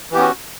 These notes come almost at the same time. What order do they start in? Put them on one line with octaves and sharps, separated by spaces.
E3 G4 B3 C#4 F#4